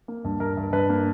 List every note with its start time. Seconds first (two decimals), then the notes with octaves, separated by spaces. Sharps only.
0.08 A#3
0.24 G2
0.40 G2 A#4
0.57 G2
0.73 G2 B4
0.89 A#3